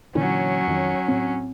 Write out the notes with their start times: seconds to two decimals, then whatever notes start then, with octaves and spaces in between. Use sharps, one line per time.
0.15 A#2 D3 E3 F#3 C#4
0.67 F2 D#3
1.08 A2 C4